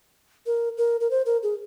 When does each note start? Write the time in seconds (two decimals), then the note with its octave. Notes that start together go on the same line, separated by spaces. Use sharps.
0.46 A#4
0.78 A#4
1.01 A#4
1.11 C5
1.26 A#4
1.43 G#4